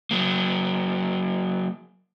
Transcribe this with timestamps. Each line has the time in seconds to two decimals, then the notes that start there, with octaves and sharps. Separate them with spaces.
0.11 F#3 A#3